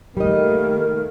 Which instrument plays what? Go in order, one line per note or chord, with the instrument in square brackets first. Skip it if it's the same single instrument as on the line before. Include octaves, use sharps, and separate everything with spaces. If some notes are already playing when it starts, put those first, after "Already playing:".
[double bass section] D#3 A3 A#3 [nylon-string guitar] G3 D#5 [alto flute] A#4